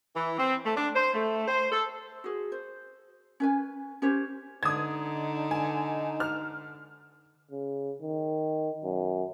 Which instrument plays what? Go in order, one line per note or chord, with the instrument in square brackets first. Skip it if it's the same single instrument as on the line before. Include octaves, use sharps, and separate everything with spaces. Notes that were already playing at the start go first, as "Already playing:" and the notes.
[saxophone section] E3
C4
A3
D4
C5
A3
C5
A4
[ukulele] F#4 G#4
C5
C#4 B4 G#5
C#4 G4 C5 C#5
[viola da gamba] D3 [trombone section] D#4 [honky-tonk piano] D#6 G#6
[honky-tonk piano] G#5
F6
[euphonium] C#3
D#3
F#2